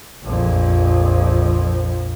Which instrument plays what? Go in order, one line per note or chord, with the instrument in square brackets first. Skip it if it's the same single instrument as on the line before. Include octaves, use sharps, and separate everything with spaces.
[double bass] A#1 F2